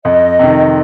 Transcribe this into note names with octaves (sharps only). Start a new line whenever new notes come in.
F2 D#5
C3 D#3